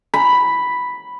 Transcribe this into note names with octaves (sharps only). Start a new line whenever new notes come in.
B5